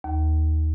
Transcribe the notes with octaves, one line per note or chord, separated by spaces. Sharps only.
D#2